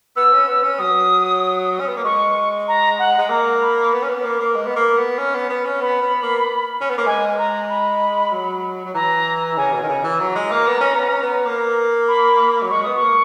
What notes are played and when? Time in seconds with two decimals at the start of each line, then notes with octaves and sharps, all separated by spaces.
0.16 B3 E6
0.32 C#4
0.48 B3
0.63 C#4
0.79 F#3 D#6
1.80 C#4
1.88 B3
1.97 A#3
2.04 G#3 C#6
2.68 A#5
2.99 F#5
3.18 G#3
3.30 A#3 A#5
3.62 B5
3.93 B3
4.02 C#4
4.09 B3
4.24 A#3
4.40 A#3
4.55 G#3
4.66 B3
4.76 A#3
4.97 B3
5.18 C#4
5.34 B3
5.49 B3
5.65 C#4
5.81 B3 B5
6.02 B3
6.22 A#3
6.81 C#4
6.90 B3
6.98 A#3
7.06 G#3 G#5
7.38 A#5
7.69 B5
8.32 F#3
8.85 F#3
8.94 E3 A#5
9.57 C#3 G#5
9.73 B2
9.83 D#3
9.88 C#3 G#5
10.04 E3
10.20 F#3 A#5
10.35 G#3
10.51 A#3
10.67 B3
10.81 C#4
10.95 B3
11.09 C#4
11.22 B3
11.45 A#3
12.08 B5
12.62 F#3
12.70 G#3 C#6
12.83 B3 D#6
12.96 C#6
13.02 A#3